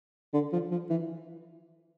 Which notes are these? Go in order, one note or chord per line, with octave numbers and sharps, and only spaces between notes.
D3
F3
F3
E3